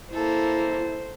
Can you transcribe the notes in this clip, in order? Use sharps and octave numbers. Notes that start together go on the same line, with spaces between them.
A#3 E4 A4 C5